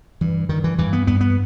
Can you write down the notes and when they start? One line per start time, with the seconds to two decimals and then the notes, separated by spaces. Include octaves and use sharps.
0.21 G2 E3
0.49 G2 D#3
0.64 E3
0.78 G2 E3
0.93 B3
1.07 G2 B3
1.21 B3